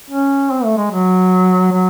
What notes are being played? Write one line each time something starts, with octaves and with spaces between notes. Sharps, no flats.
C#4
C4
A3
G#3
F#3
F#3